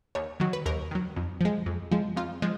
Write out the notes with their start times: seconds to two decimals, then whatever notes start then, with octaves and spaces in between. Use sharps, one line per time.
0.15 D#2 C#5
0.40 D#3 F#3
0.53 B4
0.66 D#2 A#4
0.91 D#3 F#3
1.16 F2
1.41 F3 G#3
1.66 F2
1.91 F3 G#3
2.16 F2 F4
2.42 F3 G#3